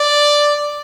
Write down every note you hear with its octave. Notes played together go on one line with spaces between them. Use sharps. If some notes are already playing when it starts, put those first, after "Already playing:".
Already playing: D5